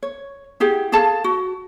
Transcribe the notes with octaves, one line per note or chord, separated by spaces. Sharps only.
C#5
E4 G4 G#4 F#5
G#4 A4 F5 A5
F#4